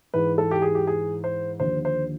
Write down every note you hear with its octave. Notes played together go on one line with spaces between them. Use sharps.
G#2 E3 B4
A4
G4
G#4
G4
G#4
C5
D#2 D3 F3 C5
C5